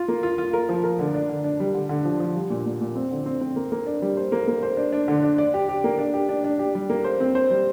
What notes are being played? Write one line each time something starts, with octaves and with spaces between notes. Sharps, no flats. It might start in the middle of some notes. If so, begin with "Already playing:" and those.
Already playing: F4
A#3
F4
F4
A#4
F3
A#4
D3
D4
D3
D4
G3
D3
D3
F3
F3
G3
A#2
A#2
A#2
C4
D3
C4
C4
A#3
A#3
D4
G3
C5
A#3
A#3
C5
D4
D4
D3
D4
D5
G4
G4
A#3
D4
G4
D4
D4
G4
G3
A#3
C5
C4
C5
G3